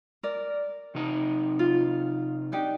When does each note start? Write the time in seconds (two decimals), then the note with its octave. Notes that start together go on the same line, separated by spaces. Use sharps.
0.23 A#4 D5
0.95 C3 D#4
1.59 F4
2.52 D4 D#4 G4